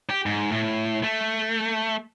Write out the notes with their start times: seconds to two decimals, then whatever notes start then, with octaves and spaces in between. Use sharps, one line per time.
0.10 G4
0.26 G#2
0.51 A2
1.03 A3